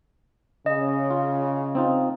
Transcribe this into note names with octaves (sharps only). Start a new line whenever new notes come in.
C#3 D#5
F4
C4 D#4 F4